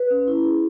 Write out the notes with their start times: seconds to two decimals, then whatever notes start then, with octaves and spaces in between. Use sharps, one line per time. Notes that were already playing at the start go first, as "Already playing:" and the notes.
Already playing: B4
0.11 C#4
0.28 E4
0.44 G#4